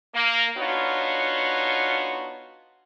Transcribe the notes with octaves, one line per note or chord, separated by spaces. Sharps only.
A#3
B3 D4 D#4 F4 F#4 C#5